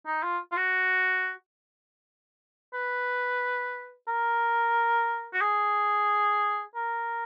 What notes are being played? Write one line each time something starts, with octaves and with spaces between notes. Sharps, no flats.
D#4
F4
F4
F#4
B4
A#4
F#4
G#4
A#4